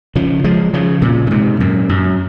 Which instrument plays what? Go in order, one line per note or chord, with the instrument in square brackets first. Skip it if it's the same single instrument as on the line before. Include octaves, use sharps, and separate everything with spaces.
[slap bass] C#3 F3
F3 G#3
C#3 F3
A#2 C#3
C#3
G#2 C3
F#2 A#2
F#2